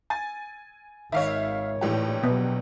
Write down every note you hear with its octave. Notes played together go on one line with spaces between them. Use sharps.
G#5 A6
G#1 D#3 C#5 E5 F5
A#1 A2 E3 G4
B2 F#3 B3